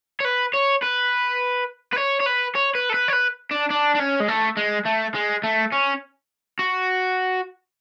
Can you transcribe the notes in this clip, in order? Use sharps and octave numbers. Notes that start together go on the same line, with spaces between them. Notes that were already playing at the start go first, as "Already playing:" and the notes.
C#5
B4
C#5
B4
B4
C#5
C#5
B4
C#5
B4
A4
B4
C#5
B4
D4
D4
D4
C#4
G#3
A3
G#3
A3
G#3
A3
C#4
F#4